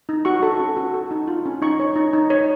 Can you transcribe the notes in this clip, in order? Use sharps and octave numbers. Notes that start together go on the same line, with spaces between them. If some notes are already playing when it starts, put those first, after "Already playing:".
D#4
F#4 C#6
A4
C#4
F#4
A4
D#4
F4
C#4
D#4 C#6
C#5
D#4
D#4
C#5